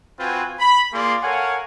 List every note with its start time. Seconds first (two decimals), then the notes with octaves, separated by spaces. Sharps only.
0.20 C4 F4 F#4 B4 G5 G#5
0.60 B5
0.93 A#3 F4 G#4 D5 C6
1.23 A4 A#4 C#5 F5 F#5 G#5